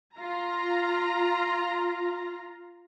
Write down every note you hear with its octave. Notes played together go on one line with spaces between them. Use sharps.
F4 A#5